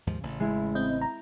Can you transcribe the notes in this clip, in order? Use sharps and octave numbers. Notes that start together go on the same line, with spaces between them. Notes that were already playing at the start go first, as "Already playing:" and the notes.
D#2 G#2 F3
A1 C#3
G#3 E4
C4 D#5 G6
A#5